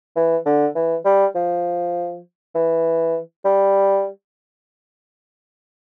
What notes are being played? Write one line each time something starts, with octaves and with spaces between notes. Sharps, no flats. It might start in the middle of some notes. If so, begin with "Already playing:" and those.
E3
D3
E3
G3
F3
E3
G3